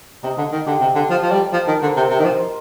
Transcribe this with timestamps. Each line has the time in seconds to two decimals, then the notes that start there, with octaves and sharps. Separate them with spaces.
0.23 C3 D#4
0.38 D3
0.52 D#3
0.66 D3 G4
0.81 C3
0.95 D3
1.10 F3 A4
1.22 F3
1.31 G3
1.53 F3 A4
1.67 D#3 A#4
1.82 D3 C5
1.96 C3 A#4
2.10 C3
2.19 D#3
2.25 F3
2.39 C5